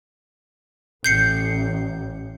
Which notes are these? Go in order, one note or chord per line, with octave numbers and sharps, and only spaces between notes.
A1 G6 C7 C#7